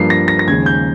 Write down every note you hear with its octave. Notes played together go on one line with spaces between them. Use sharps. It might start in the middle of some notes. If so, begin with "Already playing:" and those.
Already playing: G2 F3 A#3 C7
A#6
A#6
A#6
D#2 C#3 F3 G#3 G#6
G6